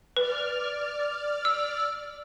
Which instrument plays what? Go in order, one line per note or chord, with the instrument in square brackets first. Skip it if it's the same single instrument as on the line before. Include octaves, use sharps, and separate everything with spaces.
[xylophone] B4 [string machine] D5 F6
[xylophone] E6